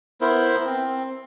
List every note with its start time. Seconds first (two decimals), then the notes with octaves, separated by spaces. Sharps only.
0.21 B3 E4 A#4 C5
0.65 C4